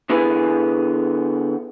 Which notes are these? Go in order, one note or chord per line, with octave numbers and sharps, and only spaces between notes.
D3 B3 E4 G#4 B4 G#5